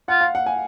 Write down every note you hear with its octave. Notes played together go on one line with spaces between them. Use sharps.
F4 F#5
F5
F#5
G#5